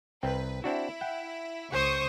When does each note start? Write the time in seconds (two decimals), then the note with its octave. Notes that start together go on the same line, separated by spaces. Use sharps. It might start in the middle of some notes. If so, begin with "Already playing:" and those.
0.23 C2 C4 B4 G5
0.64 C4 D4 E4 F#4
1.01 F#5 G5
1.72 C#2 C5 C#6 D#6